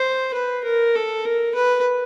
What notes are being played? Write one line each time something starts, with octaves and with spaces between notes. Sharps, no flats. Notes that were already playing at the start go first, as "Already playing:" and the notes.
Already playing: C5
B4
A#4
A4
A#4
B4